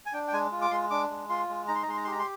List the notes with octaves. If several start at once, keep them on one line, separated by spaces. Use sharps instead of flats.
G#5
D4 G5
G5
G#3 G#5
F4
D6
G#3 C6
D4 D6
G#3
F4 C6
G#3
D#4 A#5
C6
A#5
G#3 C6
A#5
C6
G4 A#5
C6